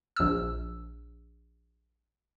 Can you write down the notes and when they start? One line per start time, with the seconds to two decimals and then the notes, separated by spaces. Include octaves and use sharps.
0.16 A#1 E6